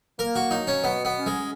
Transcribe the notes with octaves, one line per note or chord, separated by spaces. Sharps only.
A#3 A#4
F#4
F#3 D#4
C#4
B2 B3
B3
C#4
G#3